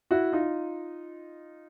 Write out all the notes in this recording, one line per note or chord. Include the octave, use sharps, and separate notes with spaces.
E4 F#4
D#4 F4